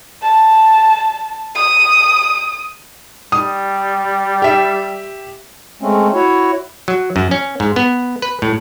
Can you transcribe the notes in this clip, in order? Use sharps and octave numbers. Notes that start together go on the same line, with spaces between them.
A5
D#6
G3 D#6
G4 E5
G#3 A3 C4 C#4
E4 F#4 C#5
F#3
F#2
C#4
G#2
B3
B4
A2